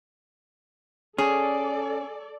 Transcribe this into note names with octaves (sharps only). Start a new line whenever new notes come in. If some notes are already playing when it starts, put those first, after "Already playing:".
C#4 G#4 A4 D5